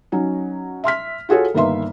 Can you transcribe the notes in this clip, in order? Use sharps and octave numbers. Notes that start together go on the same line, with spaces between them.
F#3 C#4 D#4
E5 C6 F6 B6
F4 F#4 G#4 A4 C#5
G1 D#3 A#3 B4 E5 C6